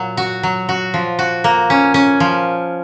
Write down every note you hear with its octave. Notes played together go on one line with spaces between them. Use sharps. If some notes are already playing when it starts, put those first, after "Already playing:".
Already playing: A#2 F#3
F#4
F#3
F#4
F3
F#4
A#3
C#4
C#4
F3